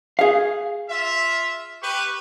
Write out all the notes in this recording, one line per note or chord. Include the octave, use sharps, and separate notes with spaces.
G#4 F5
F4 E5
G4 B4 C#6